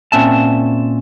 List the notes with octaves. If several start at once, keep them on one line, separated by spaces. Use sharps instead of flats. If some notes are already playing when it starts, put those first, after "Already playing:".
A#2 C4 C#4 E5 A5